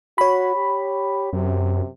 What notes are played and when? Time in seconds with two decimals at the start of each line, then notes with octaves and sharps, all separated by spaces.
0.18 F#4 C#5 B5
0.56 G4
1.33 F#2 C3